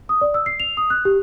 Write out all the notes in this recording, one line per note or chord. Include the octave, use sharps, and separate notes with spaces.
D#6
D5
E6
C7
F7
D#6
F#6
G4